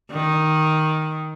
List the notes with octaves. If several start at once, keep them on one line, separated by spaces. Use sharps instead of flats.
D#3